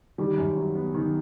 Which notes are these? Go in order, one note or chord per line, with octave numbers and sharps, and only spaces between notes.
D#3 G3
F#2
F#3
B3
D#3